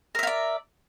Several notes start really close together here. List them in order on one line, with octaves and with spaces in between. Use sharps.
A#4 E5 F5 D5